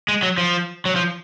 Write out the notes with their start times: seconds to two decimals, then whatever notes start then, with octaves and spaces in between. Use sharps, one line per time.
0.08 G#3
0.23 F#3
0.38 F3
0.85 F#3
0.96 F3